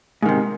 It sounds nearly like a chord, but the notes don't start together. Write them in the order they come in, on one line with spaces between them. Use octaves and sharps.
G#2 D#3 C3